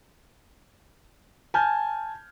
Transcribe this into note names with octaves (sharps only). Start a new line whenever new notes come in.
G#5 A5 F6 G6 G#6